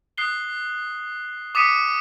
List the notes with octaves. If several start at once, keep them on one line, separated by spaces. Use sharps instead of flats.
D#6 F#6 C7 G7
D6 D#6 A6 B6 C#7 D#7